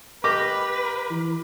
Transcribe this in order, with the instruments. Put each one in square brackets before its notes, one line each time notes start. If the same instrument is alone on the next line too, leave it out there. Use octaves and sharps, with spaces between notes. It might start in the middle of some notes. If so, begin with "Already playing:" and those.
[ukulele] G4 A#4 D#5 [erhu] B4 [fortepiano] D6
[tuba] E3